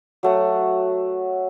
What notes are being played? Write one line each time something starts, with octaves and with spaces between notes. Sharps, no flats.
F#3 A3 F#5